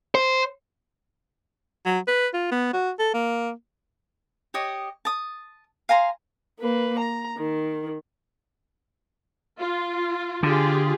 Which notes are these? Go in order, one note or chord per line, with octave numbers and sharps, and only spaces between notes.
C5
F#3
B4
F4
B3
F#4
A4
A#3
G4 C#5 D#5 D#6
A5 D#6
F5 G#5 A#5 C6
A#3 B4
A#5
D#3
F4
D3 F4 G4 G#4